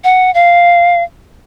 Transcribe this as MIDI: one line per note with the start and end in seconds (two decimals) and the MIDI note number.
0.04 0.33 78
0.34 1.03 77